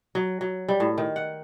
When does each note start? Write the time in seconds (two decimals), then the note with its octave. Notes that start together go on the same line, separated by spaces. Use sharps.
0.15 F#3
0.41 F#3
0.69 G3
0.80 A2
0.98 D#3
1.16 F#5